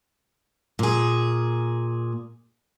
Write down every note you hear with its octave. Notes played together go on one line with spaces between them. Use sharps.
A#2 G#4